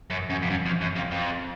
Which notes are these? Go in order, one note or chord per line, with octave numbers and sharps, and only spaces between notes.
F#2
F#2
F2
F#2
F2
F#2
F2
F2